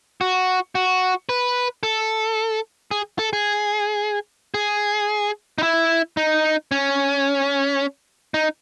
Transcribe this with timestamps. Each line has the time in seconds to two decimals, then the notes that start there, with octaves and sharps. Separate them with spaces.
0.21 F#4
0.75 F#4
1.29 B4
1.83 A4
2.91 G#4
3.19 A4
3.33 G#4
4.54 G#4
5.58 D#4
5.63 E4
6.17 D#4
6.72 C#4
8.34 D#4